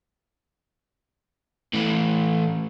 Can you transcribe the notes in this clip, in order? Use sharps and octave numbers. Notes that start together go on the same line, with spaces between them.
A2 E3